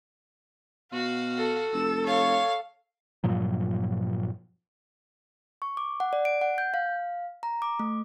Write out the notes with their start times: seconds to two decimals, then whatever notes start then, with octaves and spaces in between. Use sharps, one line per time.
0.92 B2 F#4 F5
1.37 A4
1.74 F1 E6
2.06 C#5 F5
3.24 G2 A#2 F3 F#3
5.62 C#6
5.77 D6
6.00 F#5
6.13 D5
6.25 D7
6.41 F#5
6.58 G6
6.74 F5
7.43 A#5
7.62 D6
7.79 A3